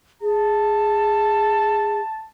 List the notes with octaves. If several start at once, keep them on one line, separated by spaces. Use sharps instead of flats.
G#4 A5